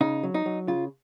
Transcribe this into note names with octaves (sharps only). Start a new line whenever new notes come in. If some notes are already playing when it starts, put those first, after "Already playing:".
C#3 D#4
F#3
D#4
F#3
C#3 F4